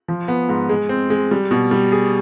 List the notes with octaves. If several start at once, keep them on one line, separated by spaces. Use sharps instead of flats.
F3
B3
G#2
G#3
C4
G#3
G3
B2
G3
G#4